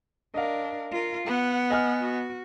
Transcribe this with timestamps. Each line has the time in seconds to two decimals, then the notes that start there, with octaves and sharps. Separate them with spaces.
0.34 D4 A#4 D#5 F5
0.91 F4 A#4
1.26 B3 F#5
1.70 D#5 G#5 F6
2.01 F#4